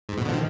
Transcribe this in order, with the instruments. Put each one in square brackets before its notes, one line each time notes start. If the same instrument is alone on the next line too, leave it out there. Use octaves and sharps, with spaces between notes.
[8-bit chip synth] G#2
B2
D3
F3
D#3